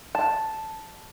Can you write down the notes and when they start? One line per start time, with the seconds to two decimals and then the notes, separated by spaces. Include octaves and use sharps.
0.15 A5